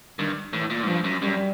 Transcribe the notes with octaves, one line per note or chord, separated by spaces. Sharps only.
G2 D#3
A2 E3
A#2
G#2
G2 F3
F#2
F#2 G3